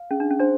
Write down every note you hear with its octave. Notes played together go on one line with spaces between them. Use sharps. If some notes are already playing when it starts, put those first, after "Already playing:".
Already playing: F5
C#4 G#4
D4
C#4
D4 C5